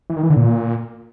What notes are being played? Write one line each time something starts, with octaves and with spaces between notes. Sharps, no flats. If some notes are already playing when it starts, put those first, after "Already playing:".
E3
D#3
E3
D3
A#2